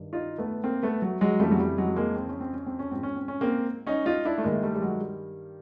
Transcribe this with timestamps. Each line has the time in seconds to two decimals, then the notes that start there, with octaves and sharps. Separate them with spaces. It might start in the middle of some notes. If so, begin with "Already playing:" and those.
Already playing: G2 D#3
0.13 D#4 F4
0.38 A3 B3
0.64 A#3 C4
0.83 A3 B3
1.02 F#3
1.21 F#3 G#3
1.40 F2 C#3 E3 G3 A3
1.51 F#3
1.59 G3
1.78 F#3 G#3
1.96 G#3 A#3
2.16 C4
2.29 C#4
2.40 C4
2.53 C#4
2.66 C4
2.79 C#4
2.91 G#2 F3 C4
3.03 C#4
3.16 C4
3.28 C#4
3.41 A#3 C4
3.87 C#4 D#4
4.06 D#4 F4
4.25 D4 E4
4.38 A3
4.44 G2 D#3 G#3 A#3
4.63 G3 A3
4.74 G3
4.82 F#3 G#3
5.01 G3